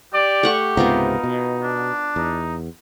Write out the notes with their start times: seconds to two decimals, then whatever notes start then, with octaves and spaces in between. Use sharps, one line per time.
0.14 G4 D5
0.43 A3 F#5 C#6
0.77 C#2 G#2 C3 B3 D#4 F4 A#4
1.24 B2
1.63 D4
2.16 E2 D#4